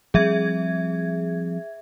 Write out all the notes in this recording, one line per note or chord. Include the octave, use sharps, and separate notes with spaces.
F3 G3 C4 G#4 E5 G#6